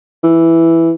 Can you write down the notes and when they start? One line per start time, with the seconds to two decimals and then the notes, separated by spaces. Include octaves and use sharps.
0.24 E3